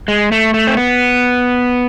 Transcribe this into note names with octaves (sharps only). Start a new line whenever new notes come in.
G#3
A3
A3
C4
B3